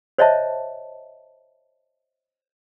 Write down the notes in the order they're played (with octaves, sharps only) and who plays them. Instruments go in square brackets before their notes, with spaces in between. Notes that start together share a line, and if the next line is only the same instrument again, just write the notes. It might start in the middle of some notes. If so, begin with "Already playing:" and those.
[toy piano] C5 C#5 D#5 E5 A5